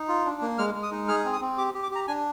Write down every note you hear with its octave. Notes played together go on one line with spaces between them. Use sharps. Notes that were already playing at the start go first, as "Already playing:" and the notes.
Already playing: D#4
F4
D4
A#3
G#3 F6
G#3
D#6
D#4
G#4 F6
C4
D#6
C4
G4 D6
G4
D6
G4 A#5
D4 G#5